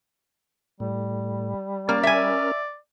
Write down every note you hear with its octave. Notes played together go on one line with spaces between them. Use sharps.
A2 G3
A#3 C#4 A#4 D5 F6
E5 G#5